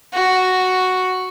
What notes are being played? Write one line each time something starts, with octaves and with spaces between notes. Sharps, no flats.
F#4